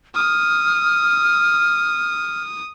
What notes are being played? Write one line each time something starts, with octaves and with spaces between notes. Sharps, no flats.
D#6 F6